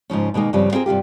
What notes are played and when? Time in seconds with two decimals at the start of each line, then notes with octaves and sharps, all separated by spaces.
0.10 G#2 C#3 F3 C#4
0.34 B2 D#3 G#3 A#3
0.53 G2 C#3 F3 G3 C4
0.71 B3 C4 F4 G#4 A#4
0.86 G2 C3 F4 G4